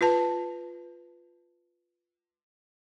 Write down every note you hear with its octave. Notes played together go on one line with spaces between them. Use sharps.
F4 B4 A5